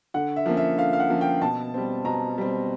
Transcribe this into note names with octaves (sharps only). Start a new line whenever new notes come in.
D3 F#5
E5
F3 A#3 C#4
E5
D3 F5
F5
F#5
F3 A#3 C#4
G5
B2 A5
G3 C4
B2 A#5
G3 C4